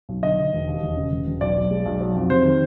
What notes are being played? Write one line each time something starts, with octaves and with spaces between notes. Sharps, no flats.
B1
D3 D#5
D3
E1
D#2
E1
C#3
E1
E1
B1 D5
B1
G#3
B1
F#3
F2
C3 C5
D#3